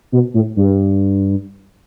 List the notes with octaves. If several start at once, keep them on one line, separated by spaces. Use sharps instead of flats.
B2
A2
G2